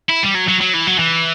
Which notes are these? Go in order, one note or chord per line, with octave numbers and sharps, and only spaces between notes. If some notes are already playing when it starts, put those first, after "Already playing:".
E4
G3
F#3
F#3
F#3
E3
F#3
E3